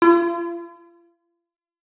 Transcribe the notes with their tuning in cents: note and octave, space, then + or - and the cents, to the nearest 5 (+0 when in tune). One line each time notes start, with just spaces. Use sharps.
F4 -45